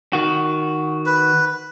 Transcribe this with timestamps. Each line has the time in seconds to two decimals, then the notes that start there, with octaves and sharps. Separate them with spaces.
0.13 D#3 F#4
1.06 B4